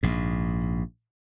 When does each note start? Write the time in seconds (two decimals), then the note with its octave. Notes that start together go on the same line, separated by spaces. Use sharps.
0.03 A#1 G#2